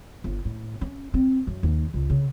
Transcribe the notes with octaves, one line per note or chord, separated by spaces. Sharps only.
G1
A2
C#4
C4
F#2
D#2
C#2
C#3